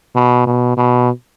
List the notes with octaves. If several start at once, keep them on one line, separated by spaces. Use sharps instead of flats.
B2
B2
B2